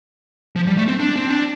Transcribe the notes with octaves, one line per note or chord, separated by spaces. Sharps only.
F3
G3
A3
C4
D4
C4
D4